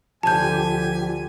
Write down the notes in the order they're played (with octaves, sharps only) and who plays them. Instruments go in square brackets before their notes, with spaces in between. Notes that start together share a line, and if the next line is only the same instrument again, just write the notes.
[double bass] D2 D3 [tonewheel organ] F3 G4 [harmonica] G#5 [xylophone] A5 G6